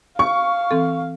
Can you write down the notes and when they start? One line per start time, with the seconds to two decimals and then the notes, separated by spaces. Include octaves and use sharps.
0.19 F5 C#6
0.71 E3 C4 A4